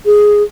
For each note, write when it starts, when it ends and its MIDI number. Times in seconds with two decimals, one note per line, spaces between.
0.06 0.43 68